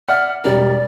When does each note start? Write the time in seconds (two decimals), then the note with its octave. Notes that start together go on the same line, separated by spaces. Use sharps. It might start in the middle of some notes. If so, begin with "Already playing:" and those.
0.08 D5 E5 F#5 F6
0.44 E1 G3 A#4 D5